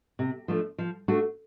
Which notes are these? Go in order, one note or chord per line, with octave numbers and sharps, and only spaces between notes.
C3
F3 A3 D4
F3
A3 D4 F#4